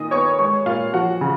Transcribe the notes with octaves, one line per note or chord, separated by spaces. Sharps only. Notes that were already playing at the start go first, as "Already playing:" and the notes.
Already playing: A#2 D#3 D#5 D#6
B3 C#5 C#6
G#3 C#5 C#6
A#2 F4 F5
F3 F#4 F#5
C#3